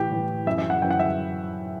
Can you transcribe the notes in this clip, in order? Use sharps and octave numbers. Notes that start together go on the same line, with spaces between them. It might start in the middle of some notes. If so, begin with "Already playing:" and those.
Already playing: A2 E3 G4
A2 E3
F#2 E3 E5
E5
F#5
F#2 E3 G5
F#5
E5